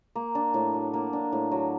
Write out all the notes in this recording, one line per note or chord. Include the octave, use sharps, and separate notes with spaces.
A#3
D4
A2
F#3
A#3
D4
A2
F#3